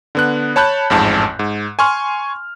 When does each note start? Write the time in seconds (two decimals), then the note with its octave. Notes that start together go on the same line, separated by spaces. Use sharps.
0.15 D3 B3 F#6
0.56 C#5 A5 B5 F#6 G6
0.90 A1 F2 G#2 A5
1.39 G#2
1.79 G#5 C6 C#6 F6